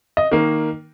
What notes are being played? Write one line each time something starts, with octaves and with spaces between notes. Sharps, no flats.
D#5
D#3 A#3